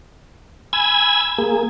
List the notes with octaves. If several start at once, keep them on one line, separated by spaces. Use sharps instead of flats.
G#5 B5 E6 G#6
A#3 G#4